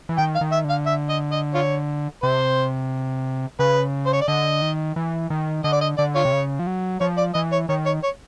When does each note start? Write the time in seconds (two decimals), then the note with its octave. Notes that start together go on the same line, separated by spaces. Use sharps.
0.09 E3
0.18 D#3 G5
0.35 F5
0.41 D#3
0.52 E5
0.65 D3
0.70 F5
0.87 E5
1.10 D#5
1.32 D#5
1.55 F4 C#5
2.23 C3 C5
3.59 C#3 B4
4.07 C5
4.13 C#5
4.21 D5
4.28 D3 D#5
4.62 D#3
4.96 E3
5.30 D#3
5.64 D3 D#5
5.73 D5
5.82 D#5
5.98 D3 D5
6.15 F4 C#5
6.25 C3
6.33 C#3
6.59 F3
6.67 F#3
7.01 F3 C#5
7.18 D5
7.35 E3 D#5
7.52 C#5
7.69 D#3 C#5
7.86 C#5
8.04 C#5